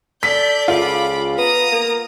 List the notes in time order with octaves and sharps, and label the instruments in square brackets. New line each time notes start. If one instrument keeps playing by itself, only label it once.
[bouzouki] A4 [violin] D5 G6 [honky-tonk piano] B6
[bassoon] C#2 [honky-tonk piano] F4 [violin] B5 D6
[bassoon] B3 [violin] A#5 D#6
[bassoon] A#3